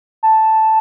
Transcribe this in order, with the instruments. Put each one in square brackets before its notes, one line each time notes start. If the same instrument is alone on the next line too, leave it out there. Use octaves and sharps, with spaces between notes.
[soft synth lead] A5